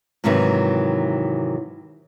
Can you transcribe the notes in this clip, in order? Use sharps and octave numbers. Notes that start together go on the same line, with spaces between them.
G#2 C3 D#3 E3 F#3 D#4